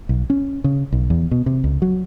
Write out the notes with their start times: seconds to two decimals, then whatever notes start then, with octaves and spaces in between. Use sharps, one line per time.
0.09 B1
0.30 C#4
0.64 C#3
0.92 B1
1.10 E2
1.31 B2
1.46 C3
1.64 C#2
1.82 F#3